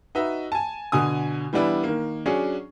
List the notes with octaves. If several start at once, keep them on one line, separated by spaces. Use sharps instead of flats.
D#4 F#4 B4 D#5 E5
G#5 A5
B2 D3 G#5 D#6
E3 G3 B3 D4 E4
D#3 A#3
F#3 C#4 D4 G#4